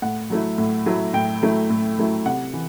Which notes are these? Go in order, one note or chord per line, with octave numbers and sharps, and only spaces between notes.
A2 F#5
F#3 A3 E4
A2
F#3 A3 E4
A2 G5
F#3 A3 E4
A2
F#3 A3 E4
C3 F#5
E3